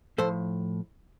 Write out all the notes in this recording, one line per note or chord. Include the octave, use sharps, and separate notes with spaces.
A2 F3 A4 C5